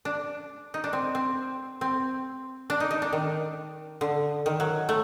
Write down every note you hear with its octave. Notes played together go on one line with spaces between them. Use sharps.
D4
D#4
D4
C4
C4
C4
D4
D#4
D#4
D4
D#3
D3
D#3
F#3
A3